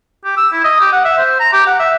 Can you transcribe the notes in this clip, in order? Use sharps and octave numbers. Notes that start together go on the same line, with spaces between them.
G4
E6
E4
D#5
G4
F#5
E5
C5
A#5
G4
F#5
E5